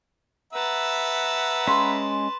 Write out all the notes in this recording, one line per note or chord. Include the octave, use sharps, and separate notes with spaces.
B4 E5 F#5 A5 A#5
G#3 C#4 B5 C6